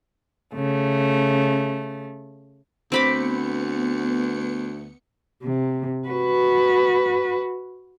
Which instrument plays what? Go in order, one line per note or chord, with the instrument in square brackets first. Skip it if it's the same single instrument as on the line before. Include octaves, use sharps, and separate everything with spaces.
[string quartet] C#3 A3
[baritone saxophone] D2 [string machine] B3 C#7 [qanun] C4 B5 D6
[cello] C3
F#4 B4